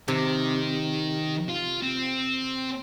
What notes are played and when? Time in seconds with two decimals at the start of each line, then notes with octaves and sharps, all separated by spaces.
0.08 C3 D#3
1.49 F4
1.82 C4